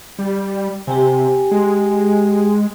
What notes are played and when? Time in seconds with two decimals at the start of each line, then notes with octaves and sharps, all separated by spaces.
0.19 G3
0.87 C3 G4 G5 G#5
1.51 G#3